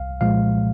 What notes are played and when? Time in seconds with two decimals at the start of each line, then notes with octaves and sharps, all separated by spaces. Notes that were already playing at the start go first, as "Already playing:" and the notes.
Already playing: C2 F5
0.21 A#2 F3 G#3 F5